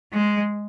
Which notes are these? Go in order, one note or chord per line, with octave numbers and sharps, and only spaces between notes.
G#3